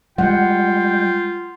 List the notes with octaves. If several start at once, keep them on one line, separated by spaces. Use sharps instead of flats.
G3 G#3 F4 F#5 G5